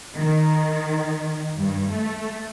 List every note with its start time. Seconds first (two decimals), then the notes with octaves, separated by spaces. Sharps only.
0.14 D#3
1.59 G2
1.91 A3